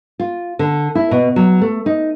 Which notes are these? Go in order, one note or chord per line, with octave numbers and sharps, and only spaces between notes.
F4
D3
E4
B2
F#3
A3
D#4